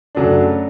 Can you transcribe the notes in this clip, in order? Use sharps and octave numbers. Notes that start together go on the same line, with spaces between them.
F#2 C#3 F#3 A3 D4